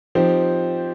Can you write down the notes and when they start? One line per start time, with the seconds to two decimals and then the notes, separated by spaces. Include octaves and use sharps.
0.15 F3 C4 D#4 G4 C5